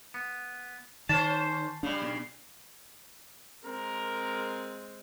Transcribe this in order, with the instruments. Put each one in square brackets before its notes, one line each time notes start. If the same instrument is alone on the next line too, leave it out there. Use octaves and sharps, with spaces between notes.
[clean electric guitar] B3
[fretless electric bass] D#3 [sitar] C#4 C5 [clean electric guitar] A5
[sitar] C#3 G3 [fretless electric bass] D4
[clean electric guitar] B1
[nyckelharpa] G#3 C4 [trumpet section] A#4